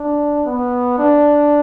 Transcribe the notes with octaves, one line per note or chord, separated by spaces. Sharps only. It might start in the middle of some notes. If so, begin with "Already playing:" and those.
Already playing: D4
B3
D4